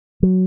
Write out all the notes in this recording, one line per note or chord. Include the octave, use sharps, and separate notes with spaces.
F#3